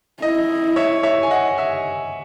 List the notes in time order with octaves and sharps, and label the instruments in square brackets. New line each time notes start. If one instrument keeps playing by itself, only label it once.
[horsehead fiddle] E4 [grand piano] D#5
[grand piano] C#5 E5
C#5 E5
G#5
D#5 F#5
E5 G#5